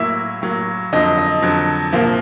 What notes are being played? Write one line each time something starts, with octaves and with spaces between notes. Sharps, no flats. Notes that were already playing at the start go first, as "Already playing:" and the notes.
Already playing: A2 F#3 A#3 E5
A2 F#3 A#3
F2 D3 F#3 D#5
D#5
F2 D3 F#3
C2 A#2 F3 A#3